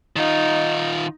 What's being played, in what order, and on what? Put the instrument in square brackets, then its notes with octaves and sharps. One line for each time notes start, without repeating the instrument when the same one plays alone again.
[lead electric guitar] D#3 F4 [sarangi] D#4